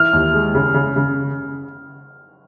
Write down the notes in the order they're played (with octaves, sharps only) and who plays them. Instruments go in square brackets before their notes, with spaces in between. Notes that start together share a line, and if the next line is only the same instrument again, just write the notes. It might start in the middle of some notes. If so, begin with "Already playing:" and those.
Already playing: [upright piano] E3 [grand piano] F6
[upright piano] D#2
G#3
C#3
C#3
C#3